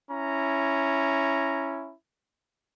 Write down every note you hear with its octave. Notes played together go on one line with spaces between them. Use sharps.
C#4 E4 A#5